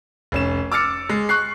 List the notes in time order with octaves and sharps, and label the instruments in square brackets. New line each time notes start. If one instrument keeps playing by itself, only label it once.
[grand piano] F1 C#4 E7
D6 E6 F6 A6 C#7
G#3
C#6 F#6 C7